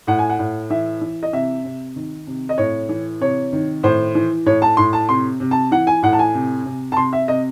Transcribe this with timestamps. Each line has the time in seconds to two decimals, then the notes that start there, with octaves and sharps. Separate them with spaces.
0.07 A2 F#5
0.19 G#5
0.29 F#5
0.39 A2
0.70 E3 E5
1.01 E3
1.23 D#5
1.33 C3 E5
1.65 C3
1.96 D#3
2.27 C3
2.49 D#5
2.58 A2 C#5
2.89 E3
3.21 C3 C#5
3.53 D#3
3.83 A2 C5
4.15 E3
4.46 A2 C#5
4.62 A5
4.77 A2 C6
4.93 A5
5.09 C3 C6
5.40 C3
5.51 A5
5.71 E3 F#5
5.87 G#5
6.03 A2 F#5
6.13 A5
6.19 G#5
6.35 C3
6.65 C3
6.92 A5
6.97 C3 C6
7.13 E5
7.28 C3 D#5